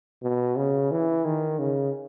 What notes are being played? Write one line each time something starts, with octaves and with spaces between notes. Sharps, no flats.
B2
C#3
E3
D#3
C#3